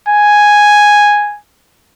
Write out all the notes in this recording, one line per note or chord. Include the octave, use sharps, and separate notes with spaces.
G#5